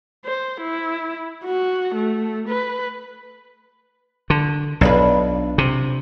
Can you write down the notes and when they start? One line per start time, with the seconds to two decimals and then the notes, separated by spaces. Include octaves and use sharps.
0.25 C5
0.61 E4
1.44 F#4
1.95 A3
2.49 B4
4.30 D3
4.81 B1 D4 F4 B4
5.58 C3